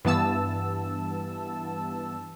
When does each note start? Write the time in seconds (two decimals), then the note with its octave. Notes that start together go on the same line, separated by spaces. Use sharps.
0.05 G2 E3 B3 A5 E6